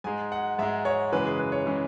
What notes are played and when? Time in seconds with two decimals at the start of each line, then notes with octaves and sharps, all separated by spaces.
0.04 G#2 G#3 G#5
0.32 F#5
0.58 G#2 G#3 E5
0.85 C#5
1.12 F#2 C#3 E3 G#3 B4
1.25 G#4
1.39 B4
1.52 C#5
1.66 C#3 E3 G#3